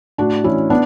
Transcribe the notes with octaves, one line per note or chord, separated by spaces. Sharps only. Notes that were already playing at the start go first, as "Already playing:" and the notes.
A2 D4 F#4
E3 C#4 E4
B3 D4